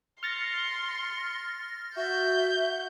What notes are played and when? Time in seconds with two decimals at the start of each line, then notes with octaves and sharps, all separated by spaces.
0.23 C6 F6 A6 A#6 C#7
1.96 F#4 E5 G6